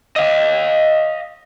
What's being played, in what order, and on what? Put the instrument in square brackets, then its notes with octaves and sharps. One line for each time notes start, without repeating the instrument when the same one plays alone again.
[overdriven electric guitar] D#5 F5